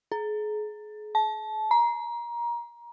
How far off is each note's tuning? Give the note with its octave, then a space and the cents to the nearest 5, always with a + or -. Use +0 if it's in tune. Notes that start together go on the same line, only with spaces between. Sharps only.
G#4 +35
A5 -20
A#5 +25